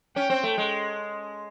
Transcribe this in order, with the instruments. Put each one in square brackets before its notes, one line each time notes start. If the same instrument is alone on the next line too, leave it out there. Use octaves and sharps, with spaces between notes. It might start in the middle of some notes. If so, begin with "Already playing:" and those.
[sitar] C#4 [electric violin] G5
[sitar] C4
A3
G#3